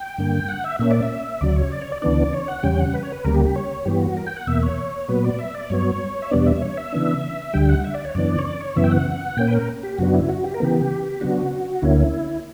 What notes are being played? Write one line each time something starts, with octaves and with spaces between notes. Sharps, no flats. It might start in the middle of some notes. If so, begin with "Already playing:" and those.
Already playing: G5
G2 D3 A#3
F#5
E5
A#2 A#3 C#4 E5
D5
E5
D2 C#3 F#3 D5
C#5
D5
C#5
D5
D2 C#3 E3 B3 D4 D5
C#5
F#5
E2 C#3 G3 C#4 G5
F#5
B4
C#5
B4
D2 C#3 G3 A#3 A#4
G4
G4
C#5
G2 E3 B3 G4
F#4
A#4
G5
F#5
E2 B2 A#3 E5
C#5
A#2 F#3 B3 B4
D5
E5
D5
G2 F#3 B3 C#5
E5
E2 B2 G3 B3 D4 D5
E5
C#5
E5
C#3 E3 B3 D4
D2 D3 G3 G5
F#5
E5
D5
C#5
F#2 C#3 E3 B3 D4 D5
C#5
D5
C#5
F#2 C#3 E3 B3 E5
G5
F#5
A#2 A#3 C#4 G5
B4
A#4
G4
F#2 C#3 F#3 B3 D4 F#4
E4
F#4
G4
A#4
C#3 E3 B3 G4
C#3 F#3 B3 D4 F#4
D2 D3 A#3 C#4 E4